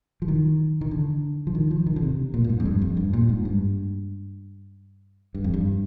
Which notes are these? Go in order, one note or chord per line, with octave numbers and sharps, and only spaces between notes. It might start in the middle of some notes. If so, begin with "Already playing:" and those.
F3
D#3
D#3
D3
F3
D#3
F3
D#3
D3
C3
A#2
A#2
G#2
F2
G2
F2
G2
A#2
G#2
G2
G2
F2
G2